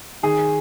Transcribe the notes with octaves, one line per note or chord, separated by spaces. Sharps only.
D#3 G#4